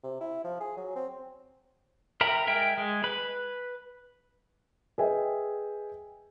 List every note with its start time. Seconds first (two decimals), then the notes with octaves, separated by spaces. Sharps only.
0.03 C3
0.20 E4
0.44 F3
0.60 G#4
0.77 F#3
0.95 C4
2.21 A#4 E5 G5 A#5 B5
2.47 G#3 A#4 E5 G5
2.78 G#3
3.04 B4 B5
4.98 G#4 B4 D#5 E5 G5 G#5